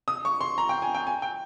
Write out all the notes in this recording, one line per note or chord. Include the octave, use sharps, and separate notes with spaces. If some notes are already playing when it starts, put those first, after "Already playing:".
D#6
C#6
C6
A#5
G5
G#5
G5
G#5
G5